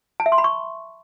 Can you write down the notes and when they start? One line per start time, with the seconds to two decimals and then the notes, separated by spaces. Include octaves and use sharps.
0.20 A5
0.26 E5
0.32 C6
0.38 B5
0.44 C#6